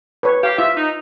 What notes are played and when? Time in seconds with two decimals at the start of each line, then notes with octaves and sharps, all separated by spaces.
0.23 B4 C#5
0.43 G4 F5
0.59 F4 E5
0.76 D#4